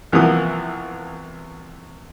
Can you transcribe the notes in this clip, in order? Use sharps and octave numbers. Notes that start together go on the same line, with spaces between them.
C2 E3 F3 A#3 B3 D#6